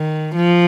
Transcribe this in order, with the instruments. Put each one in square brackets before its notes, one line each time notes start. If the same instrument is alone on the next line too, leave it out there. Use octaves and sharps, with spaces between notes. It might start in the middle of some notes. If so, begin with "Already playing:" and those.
Already playing: [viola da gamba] D#3
F3